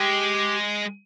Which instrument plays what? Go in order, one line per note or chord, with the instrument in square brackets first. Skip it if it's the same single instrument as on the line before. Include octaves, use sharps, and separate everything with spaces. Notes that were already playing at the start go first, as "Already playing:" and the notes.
Already playing: [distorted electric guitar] G#3 [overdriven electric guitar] G4